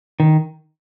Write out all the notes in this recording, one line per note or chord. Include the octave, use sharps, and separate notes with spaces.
D#3